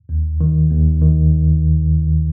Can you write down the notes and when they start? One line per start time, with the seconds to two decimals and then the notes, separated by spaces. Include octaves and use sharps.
0.09 D#2
0.41 D#3
0.70 D#2
1.02 D#3